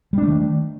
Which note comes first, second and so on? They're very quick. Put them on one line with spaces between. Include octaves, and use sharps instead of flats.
G3 D4 A3 D#3